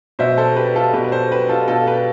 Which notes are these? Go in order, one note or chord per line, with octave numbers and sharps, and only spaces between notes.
B2 C5 E5
A4 C5
G4 B4
F4 A4
B2 G4 B4
B4
A4 C5
G4 B4
F4 A4
B2 F4 A4
G4 B4